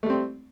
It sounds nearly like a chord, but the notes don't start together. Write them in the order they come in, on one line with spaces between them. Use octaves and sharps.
A3 G3 C4